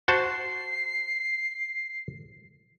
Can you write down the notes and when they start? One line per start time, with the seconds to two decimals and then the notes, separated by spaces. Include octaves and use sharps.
0.08 F#4 C5 A5 C7